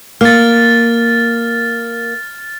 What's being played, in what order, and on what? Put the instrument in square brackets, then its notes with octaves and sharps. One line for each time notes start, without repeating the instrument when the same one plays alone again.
[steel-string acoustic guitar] A#3 [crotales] F6 A6